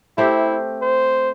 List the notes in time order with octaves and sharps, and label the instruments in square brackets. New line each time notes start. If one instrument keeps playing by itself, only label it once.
[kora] A3 C4 G4 [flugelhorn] E4
[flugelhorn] C5